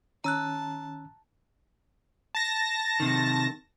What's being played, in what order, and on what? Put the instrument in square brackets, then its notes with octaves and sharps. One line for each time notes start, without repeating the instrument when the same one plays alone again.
[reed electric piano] D#3 C#4 [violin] A5 [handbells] A#5 E6 F#6
[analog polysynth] A5 A#6
[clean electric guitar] C3 D#3